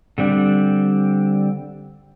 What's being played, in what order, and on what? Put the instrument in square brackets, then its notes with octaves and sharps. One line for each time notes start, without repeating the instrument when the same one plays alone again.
[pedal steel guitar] D3 G3 C4 D4